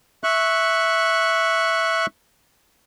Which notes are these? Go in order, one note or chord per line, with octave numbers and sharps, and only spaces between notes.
E5 C#6 F#6